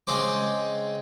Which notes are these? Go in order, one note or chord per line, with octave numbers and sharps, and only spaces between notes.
C#3 G#3 C4 D6